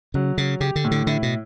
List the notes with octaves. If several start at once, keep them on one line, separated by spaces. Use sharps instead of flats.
C#3 F#3
C#3 F#3
C#3 G4
D3
A2
D3
D3 E4
B2